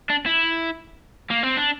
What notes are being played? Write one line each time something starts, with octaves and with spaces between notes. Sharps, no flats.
D4
E4
A#3
C4
D4